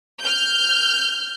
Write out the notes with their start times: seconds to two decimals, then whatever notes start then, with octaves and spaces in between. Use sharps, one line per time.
0.22 F6 G6